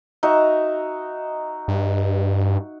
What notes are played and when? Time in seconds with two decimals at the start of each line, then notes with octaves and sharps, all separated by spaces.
0.23 D#4 F#4 E5
1.68 G2